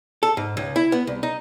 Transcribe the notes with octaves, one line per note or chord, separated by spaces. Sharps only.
A4
G#2
C#2
E4
B3
C2
D#4